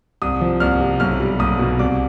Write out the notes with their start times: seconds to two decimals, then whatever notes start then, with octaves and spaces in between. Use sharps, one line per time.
0.22 C2 D#6
0.41 F3
0.60 C2 F6
0.81 C3
1.00 B1 F6
1.20 G3
1.39 B1 D#6
1.59 B2
1.79 C2 D6